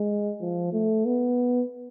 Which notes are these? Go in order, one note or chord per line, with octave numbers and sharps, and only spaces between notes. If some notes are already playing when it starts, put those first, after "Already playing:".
Already playing: G#3
F3
A3
B3